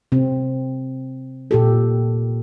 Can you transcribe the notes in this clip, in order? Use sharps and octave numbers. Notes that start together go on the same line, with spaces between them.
C3 C4
A#2 G4 A4